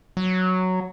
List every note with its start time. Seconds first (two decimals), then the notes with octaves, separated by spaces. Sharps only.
0.17 F#3